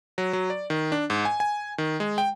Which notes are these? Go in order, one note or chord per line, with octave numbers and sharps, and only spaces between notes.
F#3
F#3
D5
D#3
D4
G#2
G#5
G#5
D#3
G#3
G5